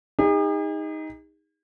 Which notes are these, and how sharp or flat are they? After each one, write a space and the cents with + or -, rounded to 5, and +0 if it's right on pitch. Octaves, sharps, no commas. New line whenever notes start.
D#4 +10 G#4 -45